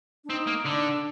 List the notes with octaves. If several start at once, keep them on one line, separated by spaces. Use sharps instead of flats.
D4
C4 D#4
A#3
D3 D4